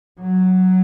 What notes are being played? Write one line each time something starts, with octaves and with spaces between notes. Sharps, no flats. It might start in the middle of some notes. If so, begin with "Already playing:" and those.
F#3